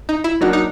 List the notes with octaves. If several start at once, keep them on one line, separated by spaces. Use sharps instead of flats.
D#4
E4
F#3 A#3 D4 D#4 F#4
D#4